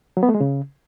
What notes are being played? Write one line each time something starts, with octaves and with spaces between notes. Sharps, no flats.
F#3
B3
A3
G#3
C#3